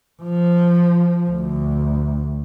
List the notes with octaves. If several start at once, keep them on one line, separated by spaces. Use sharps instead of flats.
F3
D2